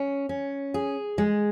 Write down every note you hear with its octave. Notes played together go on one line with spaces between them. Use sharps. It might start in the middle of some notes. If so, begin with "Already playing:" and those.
Already playing: C#4
C#4
G#4
G#3